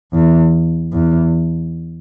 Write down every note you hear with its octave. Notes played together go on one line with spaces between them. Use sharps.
E2
E2